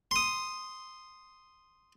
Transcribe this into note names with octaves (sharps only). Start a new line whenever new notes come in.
C6 D#6